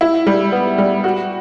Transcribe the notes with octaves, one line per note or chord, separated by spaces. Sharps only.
E4
G3
B3
G3
F#4